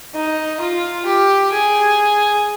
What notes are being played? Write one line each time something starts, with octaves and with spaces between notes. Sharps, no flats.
D#4
F4
G4
G#4